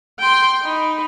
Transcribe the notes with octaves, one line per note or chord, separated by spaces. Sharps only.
G5 C6
D#4 B5